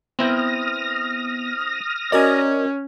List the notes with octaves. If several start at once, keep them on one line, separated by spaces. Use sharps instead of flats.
B3 C4 E4 G5 D#6 F6 A#6
C#4 F#4 A#4 D5 D#5 G#5